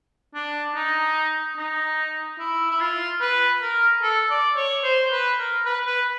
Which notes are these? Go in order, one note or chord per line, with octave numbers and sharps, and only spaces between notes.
D4
D#4
D#4
E4
E4
F4
B4
A#4
A4
D5
C#5
C5
B4
A#4
B4
B4